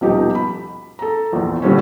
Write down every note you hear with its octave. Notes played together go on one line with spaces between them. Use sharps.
D#1 B2 F3 D#4 G4
B5
A4 A#5
A#1 E2
G2 A#2 D3 G3 C4 C#4